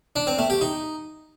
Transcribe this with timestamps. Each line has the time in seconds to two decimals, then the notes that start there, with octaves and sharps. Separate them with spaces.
0.16 D4
0.27 C4
0.38 A3
0.50 G4
0.61 D#4